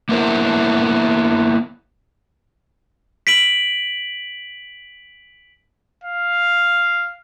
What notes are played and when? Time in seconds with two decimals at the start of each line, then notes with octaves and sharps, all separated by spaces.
0.09 A#3 B3 E4 A#4 C5
3.27 B6 D7 F#7
6.04 F5